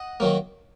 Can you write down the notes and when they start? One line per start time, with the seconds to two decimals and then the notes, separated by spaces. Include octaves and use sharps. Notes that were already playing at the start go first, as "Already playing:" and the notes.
Already playing: D#5 F#5
0.20 D#3 F#3 A#3